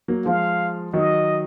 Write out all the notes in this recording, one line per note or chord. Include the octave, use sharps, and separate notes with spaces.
F#3 A#3
F3 G#3 F5
D#3 F#3 D#5